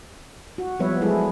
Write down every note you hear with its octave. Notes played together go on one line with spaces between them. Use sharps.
F#4
F3 G3 B3 B4 C#5 E5
F#3 G#3 E4 G#4 A4